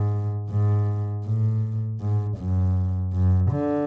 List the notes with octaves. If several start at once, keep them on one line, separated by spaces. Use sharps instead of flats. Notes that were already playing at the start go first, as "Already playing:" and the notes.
Already playing: G#2
G#2
A2
G#2
F#2
F#2
D3